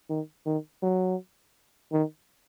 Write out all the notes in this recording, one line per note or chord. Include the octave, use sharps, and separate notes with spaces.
D#3
D#3
F#3
D#3